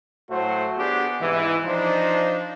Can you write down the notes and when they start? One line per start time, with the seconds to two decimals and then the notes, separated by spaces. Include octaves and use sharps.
0.30 A2 F#3 A3 F#4 C5
0.78 B3 D4 G4 G#4
1.21 G#2 C3 E3
1.65 F3 D4 D#4 C5